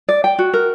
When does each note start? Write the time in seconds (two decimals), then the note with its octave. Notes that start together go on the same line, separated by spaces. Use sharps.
0.09 D5
0.24 G5
0.39 F#4
0.54 A#4